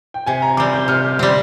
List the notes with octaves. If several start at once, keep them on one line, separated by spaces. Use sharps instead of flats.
G5
C3 G#5
A#5
G3 C4 D6
G6
C3 F6
G3 C4